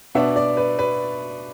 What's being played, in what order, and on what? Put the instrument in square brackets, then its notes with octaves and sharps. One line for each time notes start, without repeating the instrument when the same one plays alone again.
[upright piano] B2 B3 D4 E5
D5
B4
B4